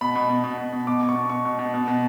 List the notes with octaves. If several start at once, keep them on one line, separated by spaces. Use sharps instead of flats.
B2 B5
B2
B2
B2
B2
B2
B2 D6
B2
C#6
B2
B2 C#6
B2
B2
B2
B2